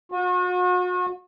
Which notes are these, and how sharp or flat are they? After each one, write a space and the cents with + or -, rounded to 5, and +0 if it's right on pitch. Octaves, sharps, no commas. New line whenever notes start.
F#4 -40